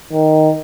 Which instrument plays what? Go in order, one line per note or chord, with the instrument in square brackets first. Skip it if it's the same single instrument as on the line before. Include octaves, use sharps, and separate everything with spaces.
[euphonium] D#3